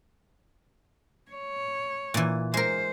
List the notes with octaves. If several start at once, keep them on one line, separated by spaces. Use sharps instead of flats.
C#5
A#2 E3
G#3 A#4 C5